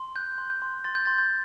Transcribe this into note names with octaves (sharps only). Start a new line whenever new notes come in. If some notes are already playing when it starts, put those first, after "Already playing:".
Already playing: C6
F#6 G6
C6
G6
C6
C6 A6
G6
C6 A6
G6